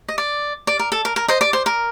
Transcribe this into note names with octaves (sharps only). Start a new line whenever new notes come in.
D#5
D5
D5
A#4
A4
A#4
A#4
C5 D#5
D5
C5
A#4